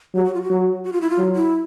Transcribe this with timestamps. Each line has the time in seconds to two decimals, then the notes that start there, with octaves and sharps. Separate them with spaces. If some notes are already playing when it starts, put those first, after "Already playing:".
0.15 F#3 G4
0.24 F#4
0.34 F4
0.42 F#4
0.50 F#3
0.84 F#4
0.93 F4
1.01 E4
1.10 F4
1.18 F#3
1.36 E4